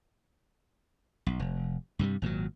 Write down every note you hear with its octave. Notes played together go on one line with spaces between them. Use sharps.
B1
F1
G2 C3 E3 G3
G#1 A#2 D3 F#3